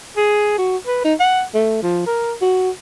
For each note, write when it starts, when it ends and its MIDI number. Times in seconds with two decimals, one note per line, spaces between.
0.17 0.58 68
0.58 0.77 66
0.87 1.04 71
1.05 1.14 63
1.20 1.43 78
1.54 1.81 57
1.83 2.06 53
2.07 2.34 70
2.42 2.70 66